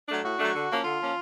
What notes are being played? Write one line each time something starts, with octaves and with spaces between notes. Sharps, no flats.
F#3 A3 D4
A2 F#4
F#3 A3 D4
D3
F3 A#3 C#4
D3 F4
F3 A#3 C#4